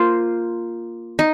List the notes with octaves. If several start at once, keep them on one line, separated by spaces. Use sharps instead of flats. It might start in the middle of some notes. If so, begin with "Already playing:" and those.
Already playing: A#3 F4 C5
D#4